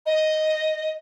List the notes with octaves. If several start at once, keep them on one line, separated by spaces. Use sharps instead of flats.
D#5